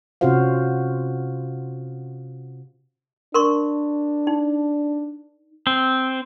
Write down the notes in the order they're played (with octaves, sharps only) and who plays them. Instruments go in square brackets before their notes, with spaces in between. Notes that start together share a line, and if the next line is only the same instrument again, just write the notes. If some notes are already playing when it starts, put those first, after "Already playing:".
[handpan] C3 C#4 F4 F#4 C5 F5
[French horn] D4 [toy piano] A#4 C6 C#6
[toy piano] D#4
[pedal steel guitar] C4